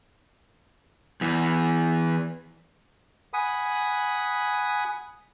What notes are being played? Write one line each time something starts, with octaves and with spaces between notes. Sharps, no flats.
E2 E3
F#5 G#5 B5 D#6